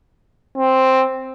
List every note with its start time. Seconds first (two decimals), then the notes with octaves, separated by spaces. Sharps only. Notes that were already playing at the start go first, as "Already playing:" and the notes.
0.58 C4